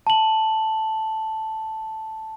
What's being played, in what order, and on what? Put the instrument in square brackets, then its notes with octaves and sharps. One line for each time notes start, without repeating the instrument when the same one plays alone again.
[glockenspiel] A5 F#7